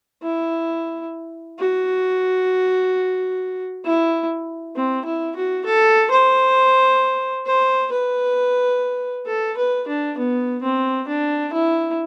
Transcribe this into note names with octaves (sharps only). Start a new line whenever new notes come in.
E4
F#4
E4
C4
E4
F#4
A4
C5
C5
B4
A4
B4
D4
B3
C4
D4
E4